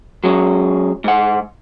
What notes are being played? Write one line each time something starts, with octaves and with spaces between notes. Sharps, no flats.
F#3 G#3 C#4
G#2 F#5